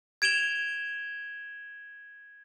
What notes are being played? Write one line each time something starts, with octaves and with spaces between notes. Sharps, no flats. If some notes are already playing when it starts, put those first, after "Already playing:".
G#6 D7 E7 F7 G7